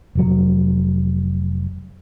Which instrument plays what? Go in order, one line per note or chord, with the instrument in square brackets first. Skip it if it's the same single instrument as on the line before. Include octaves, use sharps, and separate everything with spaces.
[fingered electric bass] F1 F#3